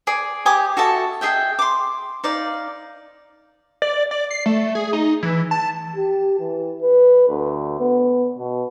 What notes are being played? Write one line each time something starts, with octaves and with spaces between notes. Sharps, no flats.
G#4 D5
G4 G#5 D6 D#6
F#4 A4 E5 A5
G#4 D#5 E5 G5
C6 D6
D#4 D5 F5
D5
D5
C7
A3
G#4
D#4
E3
A5
G4
E3
B4
D2
B3
B2